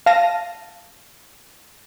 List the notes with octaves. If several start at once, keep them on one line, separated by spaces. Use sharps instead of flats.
F5 A5 A#6 D#7